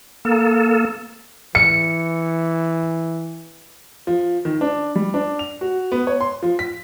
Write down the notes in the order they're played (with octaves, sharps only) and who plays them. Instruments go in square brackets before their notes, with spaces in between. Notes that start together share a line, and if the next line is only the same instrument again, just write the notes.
[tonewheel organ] A#3 A4
[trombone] E3 [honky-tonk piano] C#7
[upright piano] F3
D#3
D4
G3
D4
F7
F#4
B3
C#5
C6
F3
B6